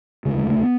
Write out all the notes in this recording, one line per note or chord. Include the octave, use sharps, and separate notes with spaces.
E1 D2 C#3 G#3
G#3
A3
B3